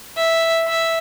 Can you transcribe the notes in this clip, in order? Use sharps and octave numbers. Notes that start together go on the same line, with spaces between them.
E5
E5